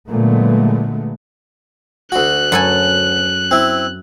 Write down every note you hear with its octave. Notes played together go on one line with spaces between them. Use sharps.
A#2 D3 F#3 G#3 A3 B3
D2 F#4 F#6
F#2 A4 G#5
C4 E4